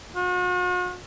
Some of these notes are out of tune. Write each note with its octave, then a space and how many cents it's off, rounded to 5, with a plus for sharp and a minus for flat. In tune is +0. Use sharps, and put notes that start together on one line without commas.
F#4 -45